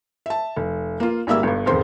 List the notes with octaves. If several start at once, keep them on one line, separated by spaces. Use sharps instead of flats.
E5 A5
F1
A#3 F4
G#1 G3 A#3 E5 E6
G1 G2
E1 F2 G#2 D#3 C5 C6